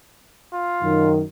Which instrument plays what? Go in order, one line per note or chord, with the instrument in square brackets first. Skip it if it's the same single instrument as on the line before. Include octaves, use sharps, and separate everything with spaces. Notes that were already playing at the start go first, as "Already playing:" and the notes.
[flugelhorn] F4
[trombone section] F#2 D#3